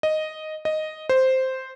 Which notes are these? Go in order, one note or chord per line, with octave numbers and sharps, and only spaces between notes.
D#5
D#5
C5